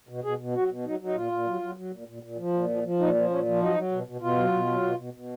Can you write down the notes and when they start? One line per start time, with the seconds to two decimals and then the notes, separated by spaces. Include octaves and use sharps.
0.09 B2
0.24 B2 G#4
0.39 B2
0.54 F#3 F#4
0.70 B2
0.85 F#3 D#4
1.00 F#3
1.05 D#4
1.15 A#2 F4
1.32 A#2
1.47 F#3
1.61 F#3
1.77 F#3
1.92 A#2
2.07 A#2
2.23 A#2
2.38 F3
2.53 A#2
2.69 F3
2.83 F3
2.99 A#2 D#4
3.15 F3
3.30 A#2 C#4
3.45 F3
3.61 F#3 D#4
3.75 F#3
3.91 B2
4.07 B2
4.21 B2 F4
4.37 F#3
4.52 B2
4.67 F#3
4.82 B2
4.98 B2
5.14 B2